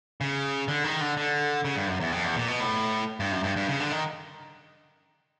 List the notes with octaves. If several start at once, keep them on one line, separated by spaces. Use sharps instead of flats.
C#3
D3
D#3
D3
D3
C#3
G2
F#2
E2
F2
E2
A#2
B2
A2
G2
F#2
G2
G2
C#3
D3
D#3